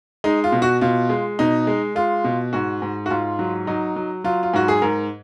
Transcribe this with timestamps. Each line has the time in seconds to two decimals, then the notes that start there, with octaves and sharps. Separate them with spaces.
0.24 G#3 D#4
0.44 F4
0.52 B2
0.62 F#4
0.81 B2 F4
1.09 G#3
1.39 B2 D#4
1.67 G#3
1.95 G#3 F4
2.24 B2
2.53 G#2 F#4
2.82 G#2
3.06 F#4
3.10 G#2 F4
3.39 F#3
3.67 F#3 D#4
3.96 F#3
4.24 F#3 F4
4.43 F4
4.53 G#2 F#4
4.68 G#4
4.82 G#2 A#4